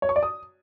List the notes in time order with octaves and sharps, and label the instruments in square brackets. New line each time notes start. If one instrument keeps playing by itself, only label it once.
[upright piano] C#5
C#6
D5
D#6